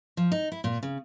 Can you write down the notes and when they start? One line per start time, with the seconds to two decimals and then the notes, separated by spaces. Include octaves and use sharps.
0.17 F3
0.32 D#4
0.52 E4
0.64 A#2
0.83 C#3